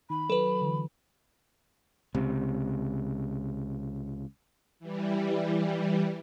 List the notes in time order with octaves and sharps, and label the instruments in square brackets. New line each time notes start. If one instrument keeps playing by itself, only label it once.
[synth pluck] D#3 [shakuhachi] B5
[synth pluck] F#3 [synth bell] A4 B4
[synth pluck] D3 E3
[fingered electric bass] C#2 C3
[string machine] E3 G3